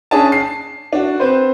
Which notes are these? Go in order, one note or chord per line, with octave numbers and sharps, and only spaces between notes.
C#4 D4 G#4 A5
C7
D4 F#4
C4 B4 C5